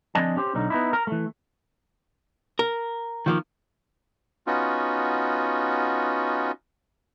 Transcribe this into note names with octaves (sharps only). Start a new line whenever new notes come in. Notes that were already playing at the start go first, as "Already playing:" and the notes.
D3 F3 C4 D4 D#5 G#5
C#4 G4 C5
B1 D3 C#4 D#4
B3 D#4 E4
A#4
E3 A3
A#4
D#3 F3 A#3
B3 C#4 D#4 F4 F#4